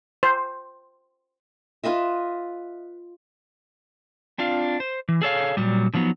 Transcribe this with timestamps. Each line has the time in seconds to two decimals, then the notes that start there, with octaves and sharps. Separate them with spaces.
0.23 C5
1.84 F4 B4 D#5 E5
4.38 C4 D4 F4 F5
4.80 C5
5.09 E3
5.22 G#4 A4 C#5 F5
5.57 A#2 F#3 G3
5.94 D3 F3 F#3 B3 D#4